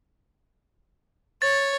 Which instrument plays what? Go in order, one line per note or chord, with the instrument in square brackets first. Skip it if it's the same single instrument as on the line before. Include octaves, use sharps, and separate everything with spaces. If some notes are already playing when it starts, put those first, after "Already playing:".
[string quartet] C#5 [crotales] A6